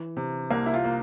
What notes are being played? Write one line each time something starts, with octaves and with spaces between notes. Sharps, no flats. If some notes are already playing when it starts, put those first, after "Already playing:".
Already playing: E3
C3
C2 A#3
E4
F4
A#3